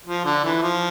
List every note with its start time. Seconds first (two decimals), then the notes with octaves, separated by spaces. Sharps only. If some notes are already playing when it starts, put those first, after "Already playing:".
0.07 F3
0.25 D3
0.44 E3
0.62 F3